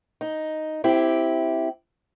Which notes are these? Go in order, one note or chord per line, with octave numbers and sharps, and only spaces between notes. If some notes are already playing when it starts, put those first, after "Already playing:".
D#4
C4 E4 G4